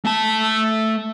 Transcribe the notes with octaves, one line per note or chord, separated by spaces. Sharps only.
A3 A5